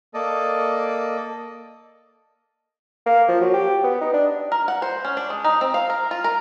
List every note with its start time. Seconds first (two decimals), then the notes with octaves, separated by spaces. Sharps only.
0.14 A#3 A4 D5 D#5
3.06 A#3
3.28 F3
3.41 F#3
3.54 G4
3.83 B3
4.01 D#4
4.14 D4
4.52 A#4
4.68 F#5
4.82 C5
5.05 C#4
5.17 D4
5.30 G#3
5.44 D#4
5.61 C4
5.74 F5
5.90 A#4
6.11 F4
6.24 A#4